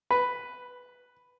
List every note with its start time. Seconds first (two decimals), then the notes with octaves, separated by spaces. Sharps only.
0.11 B4